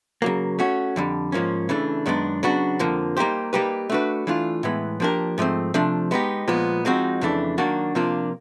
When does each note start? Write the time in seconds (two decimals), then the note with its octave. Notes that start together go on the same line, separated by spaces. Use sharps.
0.22 C#3 F#3 A#3
0.59 A3 C#4 F#4
0.96 F2 D3 G3
1.32 G#2 F3 A#3 C#4
1.69 C#3 E3 A3 D4
2.06 F#2 D#3 G#3 B3 D4
2.43 C#3 F#3 B3 D4 F#4
2.79 F2 D3 F3 A#3
3.17 G3 A#3 D#4 G4 C5
3.53 G3 A#3 D#4 G4 B4
3.90 A3 D4 F#4 B4
4.27 E3 A3 D4 F4
4.63 A2 E3 G#3 B3
5.00 F3 A#3 D4 G4 A#4
5.38 G#2 F3 A3 C4
5.74 C3 F3 A3 D4
6.11 G#3 B3 D#4 G4
6.48 A#2 F3 G#3 B3
6.85 F3 G#3 C4 D#4 F#4
7.21 F2 C#3 E3 A3 D4
7.58 D#3 F#3 A#3 D4 F#4
7.95 C3 F3 A#3 D4 F4